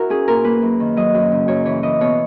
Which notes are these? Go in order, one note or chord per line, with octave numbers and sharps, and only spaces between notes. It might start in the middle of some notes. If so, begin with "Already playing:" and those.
Already playing: E4 F#4 A#4
C#4 G#4
A#2 A#4
A#3 B4
F#2
D#3
F#3 D#5
F#2
C#3
F#2 C#5
E3 C#5
E3 D#5
B2 C#5